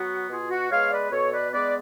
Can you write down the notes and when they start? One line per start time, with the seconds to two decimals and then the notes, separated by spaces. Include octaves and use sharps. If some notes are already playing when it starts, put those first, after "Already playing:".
Already playing: F#3 B3 F#4
0.30 B2 F4 G#4
0.50 F#4
0.70 G#3 B3 C#5 F5
0.91 B4 D5
1.11 B2 A4 C#5
1.33 B4 D5
1.52 G#3 B3 B4 D5